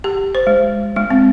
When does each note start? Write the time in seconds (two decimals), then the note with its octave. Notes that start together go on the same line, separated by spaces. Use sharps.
0.04 G4
0.35 C5
0.47 G#3
0.96 G#3
1.10 C4